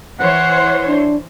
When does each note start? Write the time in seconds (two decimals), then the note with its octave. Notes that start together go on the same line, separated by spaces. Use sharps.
0.20 E3 C5 C#5 F#5
0.88 D4